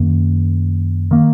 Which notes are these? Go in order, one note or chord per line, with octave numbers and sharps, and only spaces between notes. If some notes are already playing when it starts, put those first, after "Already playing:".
Already playing: F#2 D#3 A#3
D#3 A#3